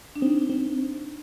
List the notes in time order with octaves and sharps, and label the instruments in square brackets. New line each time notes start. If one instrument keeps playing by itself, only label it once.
[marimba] D4
[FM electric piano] C4 [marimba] D#4
[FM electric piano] C4